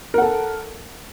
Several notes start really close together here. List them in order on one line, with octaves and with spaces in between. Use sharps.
A#4 F#5 A4